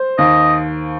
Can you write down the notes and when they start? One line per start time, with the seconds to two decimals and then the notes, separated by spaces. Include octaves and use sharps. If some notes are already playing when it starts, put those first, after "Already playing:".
Already playing: C5
0.18 D#2 D#5